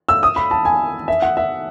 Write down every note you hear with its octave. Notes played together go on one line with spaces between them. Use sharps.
E6
D#6
B5
A5
G#5
E5
F#5
E5